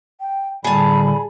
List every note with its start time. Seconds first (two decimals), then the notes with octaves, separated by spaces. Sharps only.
0.21 G5
0.64 A2 D3 G3 G#4 A5 B5